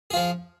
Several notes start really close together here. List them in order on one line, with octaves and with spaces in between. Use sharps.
G#4 F4 F3